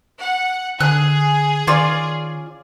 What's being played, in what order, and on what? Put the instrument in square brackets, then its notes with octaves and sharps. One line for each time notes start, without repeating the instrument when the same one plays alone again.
[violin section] F#5
[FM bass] D3 [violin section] G#4 [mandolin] F#6
[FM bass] D#3 [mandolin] C#4 F4 D5